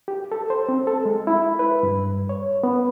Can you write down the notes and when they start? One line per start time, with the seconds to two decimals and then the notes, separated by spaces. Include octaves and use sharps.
0.08 G4
0.32 A4
0.50 C5
0.69 C4
0.87 A4
1.05 G#3
1.27 E4
1.59 B4
1.83 G2
2.29 C#5
2.63 B3